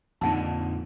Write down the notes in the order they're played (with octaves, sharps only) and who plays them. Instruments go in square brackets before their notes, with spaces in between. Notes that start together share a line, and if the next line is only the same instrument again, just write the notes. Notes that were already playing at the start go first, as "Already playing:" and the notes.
[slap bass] F2 A#2 D3 [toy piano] D#4 F#5 A5